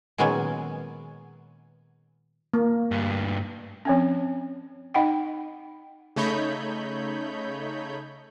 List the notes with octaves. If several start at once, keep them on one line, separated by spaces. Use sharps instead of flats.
A#2 D#3 F#3 G#3 B3 C#4
A#3
D2 G2
F3 C4 C#4
D#4 D#5 F#5 G5
C#3 A3 D#4 C#5 B5 G6